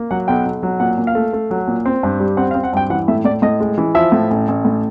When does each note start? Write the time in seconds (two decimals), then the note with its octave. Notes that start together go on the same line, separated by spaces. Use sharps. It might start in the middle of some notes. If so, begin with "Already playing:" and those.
Already playing: A#3
0.11 F#3 F#5
0.28 B1 G5
0.45 B1
0.63 F#3
0.80 A#2 F#5
0.98 A#2
1.07 F5
1.15 A3
1.33 A3
1.51 F#3
1.68 A#2
1.86 C4
2.03 G2
2.20 G3
2.37 C4 F#5
2.51 F5
2.55 C4
2.64 F#5
2.73 G2 G5
2.90 E3 F#5
3.08 A2 E5
3.25 A2 D5
3.42 A2 D#5
3.60 G#3
3.78 E3
3.95 F3 E5
4.12 A2
4.31 A1
4.48 A1
4.65 A2